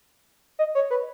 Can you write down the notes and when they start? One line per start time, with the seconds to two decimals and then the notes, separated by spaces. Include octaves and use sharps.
0.59 D#5
0.75 C#5
0.90 B4